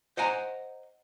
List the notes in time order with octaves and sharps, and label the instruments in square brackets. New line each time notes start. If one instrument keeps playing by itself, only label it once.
[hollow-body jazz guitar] C5 D#5 F#5 G#5 A#5